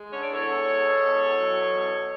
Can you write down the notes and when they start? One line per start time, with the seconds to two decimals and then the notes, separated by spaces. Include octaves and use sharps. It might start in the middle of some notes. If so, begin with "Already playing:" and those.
Already playing: G#3
0.10 D3 C#5
0.21 D5
0.29 E2 A4 C#5
0.47 E2
0.65 G#3
0.84 B2
1.02 E2
1.19 E2
1.37 F#3
1.57 B2
1.74 E2